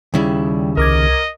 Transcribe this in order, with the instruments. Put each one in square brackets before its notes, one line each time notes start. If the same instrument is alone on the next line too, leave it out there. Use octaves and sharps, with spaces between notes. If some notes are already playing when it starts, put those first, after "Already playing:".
[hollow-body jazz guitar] D#2 C#3 E4 [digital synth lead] G3
[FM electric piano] C2 D6 G#6 [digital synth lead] A#4 [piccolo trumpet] D#5